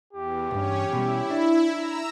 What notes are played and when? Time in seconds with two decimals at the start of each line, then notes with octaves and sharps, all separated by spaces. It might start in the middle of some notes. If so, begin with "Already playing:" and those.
0.13 E2 G4
0.51 B1 G2 C#4 C#5
0.93 B2 G3 E4
1.31 D4
1.71 A#5 E6